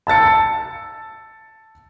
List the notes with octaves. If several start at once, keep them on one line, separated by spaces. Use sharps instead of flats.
A5 E6 A6 C#7